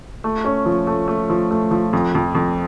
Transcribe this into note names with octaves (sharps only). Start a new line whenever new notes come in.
A3
C#4
F3
A3
A3
F3
A3
F3
F2
F2
F2